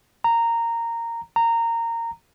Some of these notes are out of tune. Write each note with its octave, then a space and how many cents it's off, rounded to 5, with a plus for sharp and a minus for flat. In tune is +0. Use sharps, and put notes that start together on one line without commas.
A#5 -10
A#5 -15